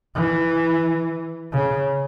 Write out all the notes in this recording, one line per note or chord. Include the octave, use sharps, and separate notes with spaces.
E3
C#3